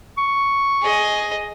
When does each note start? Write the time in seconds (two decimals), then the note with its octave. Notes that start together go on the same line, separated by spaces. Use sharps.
0.18 C#6
0.82 G#4 D#5